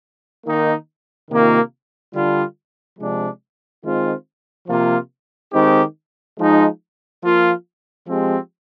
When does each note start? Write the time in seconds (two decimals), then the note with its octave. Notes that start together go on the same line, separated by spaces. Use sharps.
0.45 D#3 A#3 D#4
1.29 C3 D#3 A#3 F4
2.14 D3 G3 D4 F4
2.99 C3 F3 G#3 D4
3.83 D#3 G#3 C4 F4
4.68 C3 F3 A#3 F4
5.53 D#3 G#3 C4 D#4 G4
6.37 F3 G#3 D#4
7.22 F3 A#3 F4
8.07 F3 G#3 C4 G4